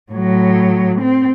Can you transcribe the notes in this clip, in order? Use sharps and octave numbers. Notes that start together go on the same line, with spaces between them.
A2 F#3
C4